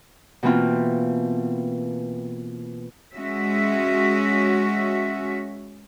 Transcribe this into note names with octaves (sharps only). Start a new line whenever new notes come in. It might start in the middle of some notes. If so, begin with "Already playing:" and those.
B2 E3 A#3 C4 F4
G#3 C#4 F#4 E5